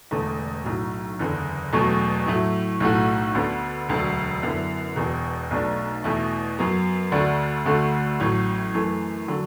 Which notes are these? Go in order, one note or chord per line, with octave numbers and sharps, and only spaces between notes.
E1 E2 D3 A3
B1 A2 F#3
F#1 E2 D3
E1 E2 B2 F#3 A3
A2 F#3 A3 E4
B1 A2 A3 F#4
D2 D3 B3 F#4
E1 D2 D3 F#3
F#2 D3 B3 E4
E1 E2 B2
B1 B2 A3 D4
E2 B2 A3 E4
F#2 F#3 B3
D2 D3 A3 D4 F#4
D2 D3 A3 F#4
A1 A2 F#3
F#2 E3 A3
D3 F#3